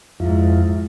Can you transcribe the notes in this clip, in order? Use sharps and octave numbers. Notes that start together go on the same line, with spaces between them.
F2 G#2 E4 F4